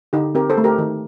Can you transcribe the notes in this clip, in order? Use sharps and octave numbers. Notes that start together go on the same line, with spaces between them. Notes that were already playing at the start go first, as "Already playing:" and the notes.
D3 D#4 G4
C4 G4 A#4
A4 C5
A3
G4 A#4
D#3